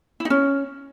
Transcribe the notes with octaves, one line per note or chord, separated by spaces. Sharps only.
E4
D#4
C#4